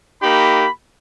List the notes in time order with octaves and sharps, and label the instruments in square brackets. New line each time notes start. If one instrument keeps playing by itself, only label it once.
[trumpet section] A#3 D#4 G4 B5